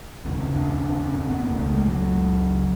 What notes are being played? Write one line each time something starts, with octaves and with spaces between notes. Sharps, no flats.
D#2 C#3 C4
C#4
D4
C#4
D4
C#4
C4
B3
C#2 C#3 A#3
A3
G#3
F#3